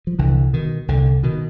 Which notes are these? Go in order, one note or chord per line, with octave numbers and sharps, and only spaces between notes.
F3
C2 D3 E3
B2 D#3
C2 D3
B2 D#3